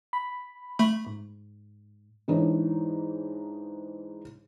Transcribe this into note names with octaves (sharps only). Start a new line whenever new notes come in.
B5
A3 B5
G#2
G#2 E3 D4 D#4 C#5